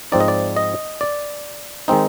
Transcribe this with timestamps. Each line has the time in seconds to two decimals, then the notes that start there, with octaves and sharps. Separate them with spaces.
0.12 G#2 F3 C4 D#4 D5
0.20 D#5
0.28 D5
0.57 D#5
1.01 D5
1.88 D#3 G#3 C4 D#4